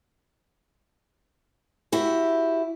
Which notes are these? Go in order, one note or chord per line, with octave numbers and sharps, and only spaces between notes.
E4 F#4 G4